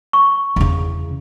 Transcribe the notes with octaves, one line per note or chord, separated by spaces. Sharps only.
C#6
E2 C#3